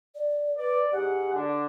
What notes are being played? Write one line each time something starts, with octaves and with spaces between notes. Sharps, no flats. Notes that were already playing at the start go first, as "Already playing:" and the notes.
D5
B4 D5
G#2 G4 G#4 F#5
D3 D4